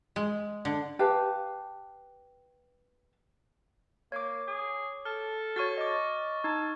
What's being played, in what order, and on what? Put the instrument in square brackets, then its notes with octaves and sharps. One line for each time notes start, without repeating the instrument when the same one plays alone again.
[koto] G#3
D3
[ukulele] G4 B4 F5 A5
[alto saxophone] A#3 [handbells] C#5 D6
[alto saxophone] G#4
[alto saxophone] A4 [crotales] F6
[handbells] F#4 C#5 [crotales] C#6 F6 A6
[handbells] D#5 D6
[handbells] D#4 [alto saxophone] A5